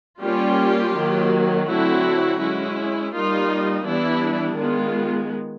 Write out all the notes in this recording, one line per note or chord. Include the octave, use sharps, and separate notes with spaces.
G3 A#3 C#4 F4 G4
D#3 F#3 A#3
D3 F#3 A3 C4 E4 F#4
G#3 C#4 E4
G3 A#3 D#4 F4
E3 G3 B3 D4 E4
D#3 G#3 B3 F4